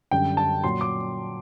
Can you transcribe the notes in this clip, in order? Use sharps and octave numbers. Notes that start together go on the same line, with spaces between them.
F#2 D3 G3 G5
A5
A#2 F#3 C6
D6